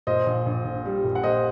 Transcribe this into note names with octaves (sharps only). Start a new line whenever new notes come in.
A#2 C5 D#5
A#1
A#1
A#1
G3
A#2
F#5
A#2 C5 D#5